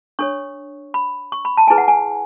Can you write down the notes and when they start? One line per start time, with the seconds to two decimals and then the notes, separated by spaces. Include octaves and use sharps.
0.19 D4 A4 C#5 C#6
0.94 B5
1.32 C#6
1.45 B5
1.57 A5
1.68 E4 G#4 B4 G#5
1.78 F#5
1.88 G#5